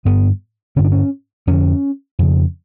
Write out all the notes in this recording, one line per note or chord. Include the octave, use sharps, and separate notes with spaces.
G2 D3 B3
G2 D3 C#4
D4
C#4
F2 D3 C#4
F2 C#3